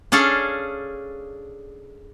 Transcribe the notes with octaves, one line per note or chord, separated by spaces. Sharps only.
C#4 D4 G#4 A4 F5